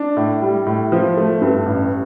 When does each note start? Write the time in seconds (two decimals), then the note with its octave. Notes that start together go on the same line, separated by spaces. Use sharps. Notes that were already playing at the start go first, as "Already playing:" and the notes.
Already playing: D4
0.17 A2
0.42 G3
0.66 A2
0.92 F3
1.17 A3
1.42 G2
1.66 A1